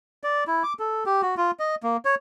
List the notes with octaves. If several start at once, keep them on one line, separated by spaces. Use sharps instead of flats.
D5
E4
D6
A4
G4
F#4
F4
D#5
A#3
C#5